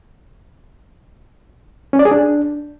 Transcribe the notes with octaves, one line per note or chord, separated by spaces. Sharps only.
C#4
D5
G#4
D4